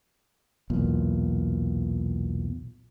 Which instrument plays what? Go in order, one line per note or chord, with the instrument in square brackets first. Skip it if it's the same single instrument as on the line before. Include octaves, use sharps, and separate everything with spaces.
[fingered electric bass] B1 E2 A#2